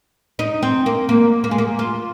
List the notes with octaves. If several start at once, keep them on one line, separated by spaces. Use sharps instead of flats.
D#4
C4
A#3
A#3
A#3
G#3
A#3
F4